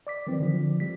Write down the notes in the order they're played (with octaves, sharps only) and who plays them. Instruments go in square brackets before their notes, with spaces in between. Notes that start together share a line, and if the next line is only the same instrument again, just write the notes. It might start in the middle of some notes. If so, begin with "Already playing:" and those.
[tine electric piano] D5 D6 B6
D#3 E3 F#3 C4
D3 F3
G3 B6